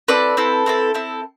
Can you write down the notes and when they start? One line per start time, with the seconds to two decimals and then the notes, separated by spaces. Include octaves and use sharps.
0.08 C4 E4 A4 B4 D5
0.37 C4 E4 A4
0.66 C4 E4 A4
0.94 C4 E4 A4